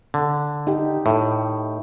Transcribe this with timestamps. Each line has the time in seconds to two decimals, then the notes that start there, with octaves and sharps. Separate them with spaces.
0.14 D3
0.67 D#4 G4
1.06 A2